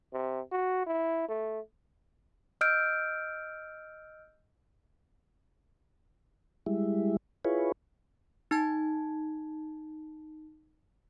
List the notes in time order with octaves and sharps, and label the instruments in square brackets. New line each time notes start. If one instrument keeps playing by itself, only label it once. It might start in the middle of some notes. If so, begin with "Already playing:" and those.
[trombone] C3
F#4
E4
A3
[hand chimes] D#5 E6 F6 G6 D7
[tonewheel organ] G3 G#3 E4
E4 F4 G#4 B4 C#5
[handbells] D#4 A5 G#6